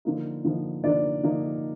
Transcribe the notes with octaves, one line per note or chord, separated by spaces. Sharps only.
D3 F3 A#3 D#4
D3 F3 A#3 D#4
D3 F3 A#3 D4 D#4 D5
D3 F3 A#3 D#4